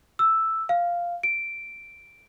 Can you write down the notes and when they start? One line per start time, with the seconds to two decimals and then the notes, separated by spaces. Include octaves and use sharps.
0.19 E6
0.69 F5
1.23 D7